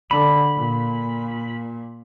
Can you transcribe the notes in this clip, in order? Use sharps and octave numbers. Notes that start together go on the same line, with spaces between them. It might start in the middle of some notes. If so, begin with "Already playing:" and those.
D3 B5
A#2